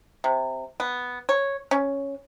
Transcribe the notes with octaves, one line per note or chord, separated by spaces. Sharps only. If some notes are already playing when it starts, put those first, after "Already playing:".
C3
B3
C#5
C#4